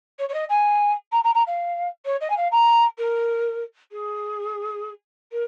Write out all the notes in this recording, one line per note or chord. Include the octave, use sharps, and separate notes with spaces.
C#5
C#5
D#5
G#5
A#5
A#5
A#5
F5
C#5
D#5
G#5
F5
A#5
A#4
G#4
A#4